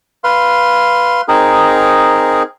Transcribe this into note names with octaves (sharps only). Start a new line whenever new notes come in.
B4 F5 C6
C4 D#4 G#4 A#4